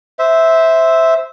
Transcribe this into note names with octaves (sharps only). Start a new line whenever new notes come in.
C5 E5